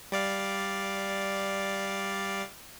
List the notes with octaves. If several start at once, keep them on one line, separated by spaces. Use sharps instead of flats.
G3 D5 F5